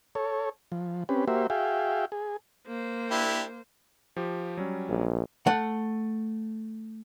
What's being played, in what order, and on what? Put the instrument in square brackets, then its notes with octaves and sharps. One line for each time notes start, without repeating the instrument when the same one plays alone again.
[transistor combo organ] A4 C#5
F3
C4 C#4 G4 B4
A#3 F#4 G4 C5 E5
F#4 G#4 E5 F5 G5
G#4
[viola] A#3 C5
[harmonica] D4 E4 G4
[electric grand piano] F3 G4
F#3 G3 C#4
[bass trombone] A#1
[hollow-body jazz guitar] A3 F#5